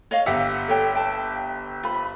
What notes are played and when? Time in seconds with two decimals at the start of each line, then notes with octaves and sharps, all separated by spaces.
0.11 C#5 D#5 F5
0.26 G1 G4 E5 F#5
0.68 A4 C#5 G5
0.95 G5 A5
1.83 F4 C5 B5